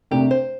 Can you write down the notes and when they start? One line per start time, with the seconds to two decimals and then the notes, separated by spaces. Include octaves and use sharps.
0.11 C2 C3 A3 D4 G4
0.31 C5